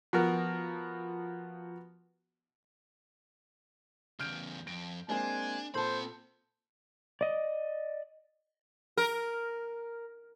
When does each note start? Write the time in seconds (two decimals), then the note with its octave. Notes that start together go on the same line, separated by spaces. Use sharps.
0.13 F3 B3 F#4 A#4
4.20 E2 C#3 F6 G6 D7
4.67 F2 D7
5.09 G#3 A#3 C4 D4 G#5
5.74 A#2 C4 A4 C5 A5 B5
7.21 D5 D#5
8.97 A#4